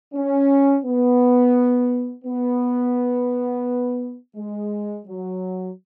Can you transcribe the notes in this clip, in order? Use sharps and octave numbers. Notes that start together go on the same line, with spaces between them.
C#4
B3
B3
G#3
F#3